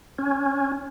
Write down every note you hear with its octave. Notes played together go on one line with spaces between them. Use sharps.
C#4